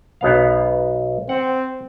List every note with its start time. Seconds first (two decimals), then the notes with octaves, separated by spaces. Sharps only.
0.21 B1 B3 F5
1.29 C4 F#5